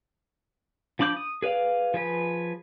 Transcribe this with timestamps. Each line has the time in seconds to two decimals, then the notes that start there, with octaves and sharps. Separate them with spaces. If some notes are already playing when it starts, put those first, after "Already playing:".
0.99 F3 D4 B5 D6 G6
1.17 D#6
1.42 G#4 B4 D5 F5
1.94 F3 G#4 B4